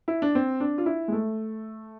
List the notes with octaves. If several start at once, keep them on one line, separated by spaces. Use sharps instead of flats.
E4
D4
C4
D4
F4
E4
G#3
A3